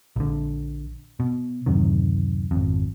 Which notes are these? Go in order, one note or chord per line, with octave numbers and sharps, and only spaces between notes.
A#1 D3
B2
D1 F#2 C3 D#3
G#1 F2